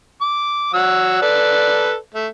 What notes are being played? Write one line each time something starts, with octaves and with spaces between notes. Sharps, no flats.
D6
F#3 F#5 E6
A4 B4 D5
A3